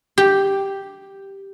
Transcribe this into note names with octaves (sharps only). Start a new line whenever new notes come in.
G4